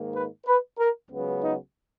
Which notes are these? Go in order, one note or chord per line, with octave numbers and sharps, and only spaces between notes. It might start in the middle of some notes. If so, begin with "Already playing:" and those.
Already playing: G#2 D#3 A#3
B4
B4
A#4
C#2 C#3 F#3 B3
D#4